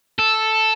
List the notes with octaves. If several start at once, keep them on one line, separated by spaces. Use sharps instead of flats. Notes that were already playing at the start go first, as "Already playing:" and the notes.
A4